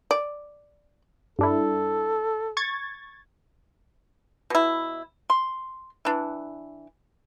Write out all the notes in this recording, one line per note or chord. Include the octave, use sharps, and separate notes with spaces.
D5
G2 D4 E4 A4
C#6 G#6 A6
B2 E4
C6
E3 D4